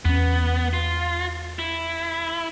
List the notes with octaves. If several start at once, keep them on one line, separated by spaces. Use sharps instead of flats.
E2 B3 C#4
F4
E4